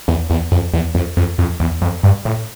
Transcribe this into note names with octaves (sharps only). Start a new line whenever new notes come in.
E2
E2
F2
E2
F2
F2
F2
E2
F2
G2
A2